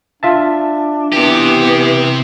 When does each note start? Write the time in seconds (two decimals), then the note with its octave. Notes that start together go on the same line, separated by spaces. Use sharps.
0.23 D4 F4 E5 A5
1.12 C3 E3 B3 G4